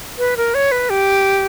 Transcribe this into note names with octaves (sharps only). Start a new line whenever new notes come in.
B4
A#4
C#5
B4
G4